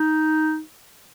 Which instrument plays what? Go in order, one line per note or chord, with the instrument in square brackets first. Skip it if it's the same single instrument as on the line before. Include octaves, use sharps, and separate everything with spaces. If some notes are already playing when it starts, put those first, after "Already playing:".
Already playing: [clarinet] D#4